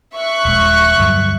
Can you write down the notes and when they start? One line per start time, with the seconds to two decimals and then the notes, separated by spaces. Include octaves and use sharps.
0.15 E5 C#6 F#6
0.45 D#1 A#1 G#3
0.98 D2 G2 F#3